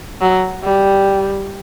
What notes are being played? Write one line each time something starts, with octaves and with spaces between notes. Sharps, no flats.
F#3
G3